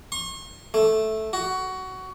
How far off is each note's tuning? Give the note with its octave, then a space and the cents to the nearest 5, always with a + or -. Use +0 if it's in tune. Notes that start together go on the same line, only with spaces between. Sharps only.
C#6 -45
A3 -5
F#4 +15